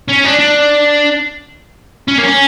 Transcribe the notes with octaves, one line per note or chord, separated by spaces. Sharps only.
C#4
D4
D4
C#4
A#3
C#4